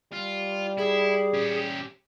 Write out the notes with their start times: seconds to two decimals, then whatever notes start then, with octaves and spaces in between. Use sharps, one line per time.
0.12 G3 F4
0.78 E4 G#4
1.34 C#4 G4